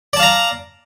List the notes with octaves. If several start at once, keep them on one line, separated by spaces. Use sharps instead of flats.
D5 F5 A5 A#5